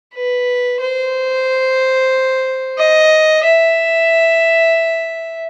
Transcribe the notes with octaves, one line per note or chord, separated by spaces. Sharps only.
B4
C5
D#5
E5